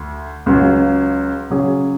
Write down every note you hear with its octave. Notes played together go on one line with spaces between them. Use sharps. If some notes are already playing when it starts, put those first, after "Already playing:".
Already playing: D2
C#2 C#3 F#3
C#3 F#3 C#4 G#4